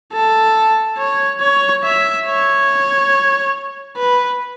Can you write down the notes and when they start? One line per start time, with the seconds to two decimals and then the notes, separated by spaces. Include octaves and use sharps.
0.13 A4
0.98 C#5
1.41 C#5
1.84 E5
2.26 C#5
3.97 B4